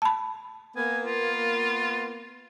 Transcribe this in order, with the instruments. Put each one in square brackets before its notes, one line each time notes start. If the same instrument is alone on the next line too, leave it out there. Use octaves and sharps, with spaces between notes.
[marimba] A5 B5
[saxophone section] A#3 B3 [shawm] G#5
[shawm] F4